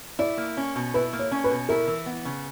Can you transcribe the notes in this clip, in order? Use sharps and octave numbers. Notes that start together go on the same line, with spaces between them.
E4 D5
A#3
C#4
B2
E4 B4
A#3
C#5
C#4
B4
B2
E4 A#4
E3
B3
C#3